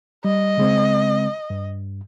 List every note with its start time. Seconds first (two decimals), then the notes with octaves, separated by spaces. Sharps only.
0.25 G3 D#5
0.58 C#3 G#3 C4
1.50 G2